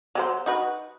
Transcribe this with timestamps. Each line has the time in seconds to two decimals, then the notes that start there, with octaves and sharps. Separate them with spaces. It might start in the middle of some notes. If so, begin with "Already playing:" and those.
0.15 F#3 G4 C5
0.46 D#4 F#4 B4